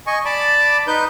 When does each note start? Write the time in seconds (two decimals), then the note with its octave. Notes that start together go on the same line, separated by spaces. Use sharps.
0.07 D#5 G#5 C#6
0.25 D5 A5 B5 D6
0.87 D#4 B4 G6